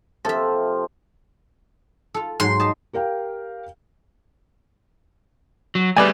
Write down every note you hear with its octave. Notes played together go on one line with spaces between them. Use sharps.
C3 F3 A4 E5
F4 A4
G#2 F#3 C6
G4 D#5 A5
G4 A#4 F5 G5
F#3
G3 A3 B4 D5 G#5